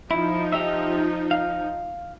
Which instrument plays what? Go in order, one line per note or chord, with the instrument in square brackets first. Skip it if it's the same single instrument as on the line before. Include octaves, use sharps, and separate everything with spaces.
[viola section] F3 D#4 [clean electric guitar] E4
[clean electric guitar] G4 D#5 E5
F5